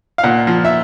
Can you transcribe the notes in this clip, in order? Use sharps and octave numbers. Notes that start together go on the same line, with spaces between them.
F5
A#2 F#5
F3
E5